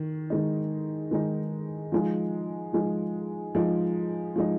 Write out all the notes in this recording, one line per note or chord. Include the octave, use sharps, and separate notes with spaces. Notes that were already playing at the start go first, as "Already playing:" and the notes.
Already playing: D#3
D#3 G#3 D#4
D#3 G#3 D#4
F3 G#3 D#4
F3 G#3 D#4
F3 G#3 D#4
F3 G#3 D#4